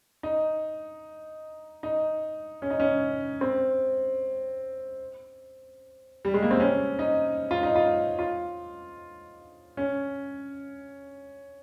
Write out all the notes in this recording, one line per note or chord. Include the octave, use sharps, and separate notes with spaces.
D#4
D#4
C#4
D#4
C#4
C4
G3
G#3
A#3
C4
C#4
D#4
F4
D#4
F4
F4
C#4